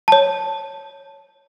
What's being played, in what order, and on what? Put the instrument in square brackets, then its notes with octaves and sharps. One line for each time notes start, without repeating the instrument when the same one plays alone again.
[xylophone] C#5 A5